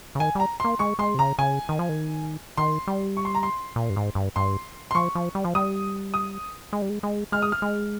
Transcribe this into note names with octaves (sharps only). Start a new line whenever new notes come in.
C#3
D#3 G#5
G3 A#5
A#3 C6
G#3 C#6
G#3 C6
C3
C#3 A#5
C#3 G#5
D#3
F3
D#3
D#3 C6
G3
C#6
C6
A#5
C6
A#2
G2
G#2
G2
G2 C6
C6
F3 C#6
F3
G3
F3
G3 D#6
D#6
G#3
G3
G#3
G#3
G#3 F6
D#6
F6
G#3